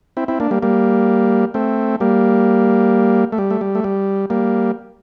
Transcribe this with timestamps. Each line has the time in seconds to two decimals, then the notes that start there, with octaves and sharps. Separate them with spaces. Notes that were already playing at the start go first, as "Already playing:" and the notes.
0.17 C4 E4
0.28 C4 E4
0.40 A#3 D4
0.51 G3 A#3
0.63 G3 A#3
1.54 A3 C4
2.00 G3 A#3
3.32 A3
3.38 G3
3.50 A3
3.61 G3
3.75 A3
3.84 G3
4.30 G3 A#3